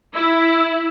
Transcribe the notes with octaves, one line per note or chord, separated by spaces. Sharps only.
E4